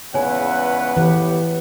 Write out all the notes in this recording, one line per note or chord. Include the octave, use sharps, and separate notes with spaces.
E2 G#2 C#3 B4 C#5 F#5 G#5
A2 E3 B3 G4